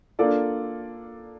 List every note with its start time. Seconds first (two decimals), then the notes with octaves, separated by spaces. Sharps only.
0.19 A#3 D4 F4 A4 D5